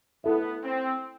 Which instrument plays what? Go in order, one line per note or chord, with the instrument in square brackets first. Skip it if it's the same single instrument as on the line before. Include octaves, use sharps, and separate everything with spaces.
[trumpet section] B3 [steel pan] E4 A4 E5
[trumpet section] C4